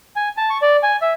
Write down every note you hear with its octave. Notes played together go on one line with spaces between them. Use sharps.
G#5
A5
C#6
D5
G#5
E5